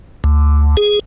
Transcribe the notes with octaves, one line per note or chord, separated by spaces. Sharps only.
D2
G#4